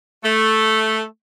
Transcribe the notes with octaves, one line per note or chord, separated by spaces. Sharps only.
A3